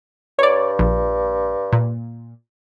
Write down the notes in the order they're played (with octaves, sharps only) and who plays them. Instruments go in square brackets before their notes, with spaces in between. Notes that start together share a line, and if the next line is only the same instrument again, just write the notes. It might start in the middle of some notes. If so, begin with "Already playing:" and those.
[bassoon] G2 [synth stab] C#5 D5
[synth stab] A#1
A#2